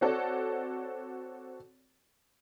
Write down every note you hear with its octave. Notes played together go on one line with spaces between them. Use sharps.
C4 F#4 A4 C#5 D5